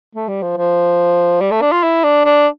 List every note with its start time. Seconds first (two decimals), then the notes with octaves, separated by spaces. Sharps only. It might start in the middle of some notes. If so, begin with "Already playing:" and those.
0.15 A3
0.28 G3
0.43 F3
0.57 F3
1.41 G3
1.51 A3
1.61 D4
1.72 F4
1.83 E4
2.04 D4
2.25 D4